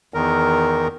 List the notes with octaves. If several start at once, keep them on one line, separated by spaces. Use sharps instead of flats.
E2 D#3 A#4